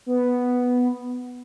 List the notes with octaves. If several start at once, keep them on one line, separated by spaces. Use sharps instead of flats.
B3